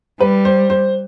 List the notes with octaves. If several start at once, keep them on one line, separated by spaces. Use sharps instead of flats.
G3 B4
C5
C5